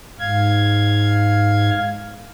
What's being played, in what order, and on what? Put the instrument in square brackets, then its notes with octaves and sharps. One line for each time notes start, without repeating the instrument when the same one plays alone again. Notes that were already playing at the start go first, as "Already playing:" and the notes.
[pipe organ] G#2 F5 G#6